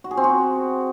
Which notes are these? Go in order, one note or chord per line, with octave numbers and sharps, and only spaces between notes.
F#4
G#4
C4
F#4